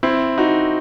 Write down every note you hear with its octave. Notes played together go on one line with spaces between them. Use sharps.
C4 E4
D#4 F#4